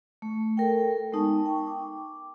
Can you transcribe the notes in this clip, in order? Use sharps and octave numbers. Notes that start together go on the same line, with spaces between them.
A3
A4 A#4 G5
G#3 B3 D#4 A5 C#6
G5 C#6
D6